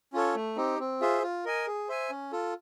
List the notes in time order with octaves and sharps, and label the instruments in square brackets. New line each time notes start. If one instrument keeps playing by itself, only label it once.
[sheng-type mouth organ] C#4 F4 A4 C#5
A3
C4 D#4 G4
C4
F4 G#4 C5 E5
F4
A#4 D#5 G#5
G#4
C5 E5 G#5
C#4
F4 A4